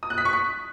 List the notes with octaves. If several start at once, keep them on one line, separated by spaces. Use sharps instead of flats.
D#6
F#6
B6
C#6
B6